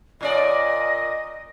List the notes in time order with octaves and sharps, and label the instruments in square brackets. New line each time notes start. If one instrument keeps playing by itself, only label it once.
[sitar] A#2 C#4 D5 [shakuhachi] D#5